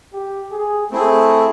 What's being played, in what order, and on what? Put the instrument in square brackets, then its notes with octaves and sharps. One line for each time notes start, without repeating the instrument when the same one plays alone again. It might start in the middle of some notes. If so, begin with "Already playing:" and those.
[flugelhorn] G4
G#4
[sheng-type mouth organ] A3 C4 E4 G#4 [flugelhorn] A4